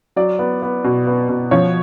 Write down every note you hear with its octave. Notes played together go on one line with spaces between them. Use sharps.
F#3 D5
B3
B3
B2
B3
B2
F3 C#5